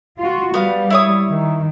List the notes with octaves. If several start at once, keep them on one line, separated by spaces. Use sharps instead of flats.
F4 F#4
G3 B3 F5
E4 C#5 D#6
D#3